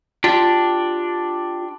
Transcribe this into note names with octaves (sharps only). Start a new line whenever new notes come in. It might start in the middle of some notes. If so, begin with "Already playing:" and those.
D4 F4 G4